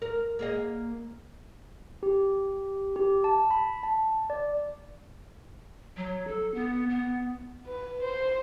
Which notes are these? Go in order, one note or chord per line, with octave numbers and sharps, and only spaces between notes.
A#4
A#3 G#4 D#5
G4
G4
A5
B5
A5
D5
F#3
A4
B3
B3
B4
C5